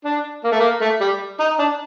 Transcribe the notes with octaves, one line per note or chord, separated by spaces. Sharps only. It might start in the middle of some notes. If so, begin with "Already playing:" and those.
D4
A#3
A3
A#3
A3
G3
D#4
D4